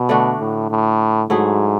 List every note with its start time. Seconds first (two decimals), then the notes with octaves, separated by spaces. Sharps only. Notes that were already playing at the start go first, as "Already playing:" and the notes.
Already playing: B2
0.09 D3 A3 D4 F#4
0.40 A2
0.70 A2
1.30 G#2 F#3 A3 E4 G#4